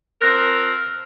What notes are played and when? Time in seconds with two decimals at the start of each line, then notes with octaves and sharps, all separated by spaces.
0.22 F3 C4 A#4 F6 F#6 A#6